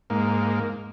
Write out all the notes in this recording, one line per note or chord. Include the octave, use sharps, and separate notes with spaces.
G#2 A#3